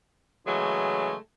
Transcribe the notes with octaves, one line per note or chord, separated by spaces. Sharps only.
C#3 E3 F#3 G#3 A3